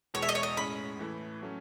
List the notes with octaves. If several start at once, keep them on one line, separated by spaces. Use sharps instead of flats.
E2 B2 G#3 C#5
E5
D#5
C#5
D#5
A2 G#3 C#4 B5
A2 E3 A3 E4
F#3 A3 C#4